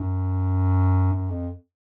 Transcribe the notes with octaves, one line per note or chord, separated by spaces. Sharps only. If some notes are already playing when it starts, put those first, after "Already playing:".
Already playing: F#2
F#2
F2